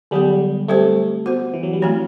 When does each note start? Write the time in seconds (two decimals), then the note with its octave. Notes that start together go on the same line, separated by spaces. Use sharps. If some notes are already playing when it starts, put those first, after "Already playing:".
0.11 D3 F#3 G3 B3
0.68 G3 A3 C4 G4 C5
1.26 B3 F#4 C5
1.54 E3
1.63 F#3
1.73 G3
1.82 F#3 A3 C4 E4